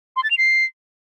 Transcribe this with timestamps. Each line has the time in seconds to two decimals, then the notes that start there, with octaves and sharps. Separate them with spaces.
0.16 C6
0.23 A6
0.31 F7
0.38 C7